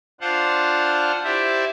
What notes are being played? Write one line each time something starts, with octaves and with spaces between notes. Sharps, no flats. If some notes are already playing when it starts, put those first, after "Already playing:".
D4 F4 C5 F5 F#5
E4 G4 C5 D5 E5